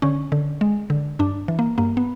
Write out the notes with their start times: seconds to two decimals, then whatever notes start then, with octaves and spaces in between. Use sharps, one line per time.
0.02 D3 C#4
0.32 D3
0.61 G#3
0.90 D3
1.19 G2 D4
1.48 E3
1.59 A#3
1.78 G2 A#3
1.97 B3